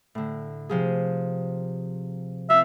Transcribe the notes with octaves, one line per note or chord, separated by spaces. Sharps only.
A2 D3
C3 F3 G#4
C4 F4 E5